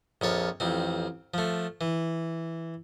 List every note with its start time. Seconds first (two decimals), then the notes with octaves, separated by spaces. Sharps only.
0.21 A#1 F2 C#5 A5
0.60 A1 F2 C4
1.34 F3 A3
1.81 E3